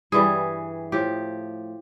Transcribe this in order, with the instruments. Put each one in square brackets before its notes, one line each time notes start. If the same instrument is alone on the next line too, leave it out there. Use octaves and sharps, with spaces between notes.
[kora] G2 E3 G3 G#4
A2 F3 G4